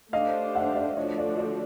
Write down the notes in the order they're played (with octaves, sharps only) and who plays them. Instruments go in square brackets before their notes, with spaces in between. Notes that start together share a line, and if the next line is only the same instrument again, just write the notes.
[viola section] A3 D4 G4 C5 [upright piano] D#5 F5
[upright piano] E5 F#5
D5 E5
[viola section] D3 F3 A3 D4 F#4 [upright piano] C#5 D#5
[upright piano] D5
D5